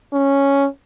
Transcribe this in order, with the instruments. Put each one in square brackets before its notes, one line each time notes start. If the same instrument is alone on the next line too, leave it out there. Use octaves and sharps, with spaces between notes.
[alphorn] C#4